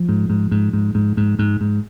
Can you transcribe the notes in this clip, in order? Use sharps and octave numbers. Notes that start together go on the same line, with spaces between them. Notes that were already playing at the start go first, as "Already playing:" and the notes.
Already playing: F3
G#2
G#2
G#2
G#2
G#2
G#2
G#2
G#2